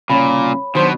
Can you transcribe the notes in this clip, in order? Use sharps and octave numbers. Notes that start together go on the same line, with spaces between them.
C2 A#2 C#3 C#4 C#5 B5
B2 D#3 F#3 B3 D4 C5